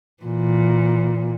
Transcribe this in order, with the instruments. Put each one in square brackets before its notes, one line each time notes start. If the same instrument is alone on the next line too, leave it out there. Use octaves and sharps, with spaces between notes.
[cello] A#2 E3